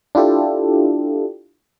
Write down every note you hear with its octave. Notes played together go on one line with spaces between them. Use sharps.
D4 E4 F4 G4 A4